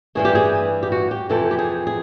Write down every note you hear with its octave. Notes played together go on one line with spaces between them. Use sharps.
G2 E3 A3 G#4
G4
G#4
G4
F#4
G4
F2 C3 E3 A4
G4
G#4
G#4